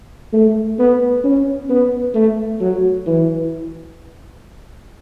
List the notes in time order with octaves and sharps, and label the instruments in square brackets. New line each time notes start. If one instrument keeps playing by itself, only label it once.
[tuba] A3
B3
C#4
B3
A3
F#3
E3